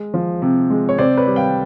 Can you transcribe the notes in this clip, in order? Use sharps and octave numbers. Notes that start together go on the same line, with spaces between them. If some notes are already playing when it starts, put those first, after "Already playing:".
Already playing: G#3
F3
C3
G#3
C#5
C3 C5 D5
B4 C#5
G3
F5 G5